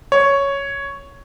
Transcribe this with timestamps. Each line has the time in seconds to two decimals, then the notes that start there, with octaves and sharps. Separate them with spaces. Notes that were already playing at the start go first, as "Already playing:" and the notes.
0.12 C#5